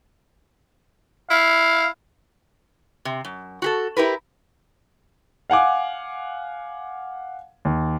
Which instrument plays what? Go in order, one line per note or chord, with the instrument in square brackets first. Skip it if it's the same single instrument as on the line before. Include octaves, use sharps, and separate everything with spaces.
[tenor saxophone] E4 [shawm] F5
[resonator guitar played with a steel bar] C3
F#2
F#4 G4 A4
E4 G4 A#4 B4
[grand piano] F5 F#5 G#5 D6
D#2